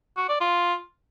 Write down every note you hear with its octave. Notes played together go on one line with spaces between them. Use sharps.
F#4
D5
F4